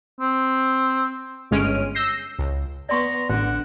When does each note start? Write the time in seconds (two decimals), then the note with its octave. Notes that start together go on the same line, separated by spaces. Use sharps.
0.21 C4
1.51 G1 G#3 C#4 F6 D7 D#7
1.95 E6 G6 A#6 C7
2.39 C#2
2.89 B3 D5 A#5 C6 C#6
3.30 A1 D3 F#5